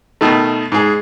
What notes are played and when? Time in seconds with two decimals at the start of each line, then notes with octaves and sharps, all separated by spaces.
0.21 B2 D#3 A3
0.72 G#2 G#4